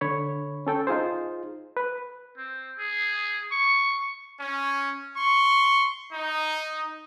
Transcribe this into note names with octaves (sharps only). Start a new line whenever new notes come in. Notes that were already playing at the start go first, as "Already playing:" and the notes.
D3 C#5 B5
C#4 A4 G5
D#4 F4 G#4 C5
B4
C4
G#4
C#6
C#4
C6 C#6
D#4